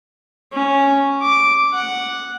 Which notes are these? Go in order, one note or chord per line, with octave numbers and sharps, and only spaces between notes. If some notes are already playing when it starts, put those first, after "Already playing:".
C#4
D6
F#5